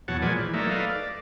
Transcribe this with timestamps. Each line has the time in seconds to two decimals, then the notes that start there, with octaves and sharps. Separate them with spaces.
0.08 E2 B2 F#3 C#5 F#5 A5
0.22 A#2 F3 G#3 B4 D5 G#5
0.38 E3
0.54 F#3 A3 A#3 D#4 D5 E5
0.70 A4 B4 D5 D#5 F5
0.89 D5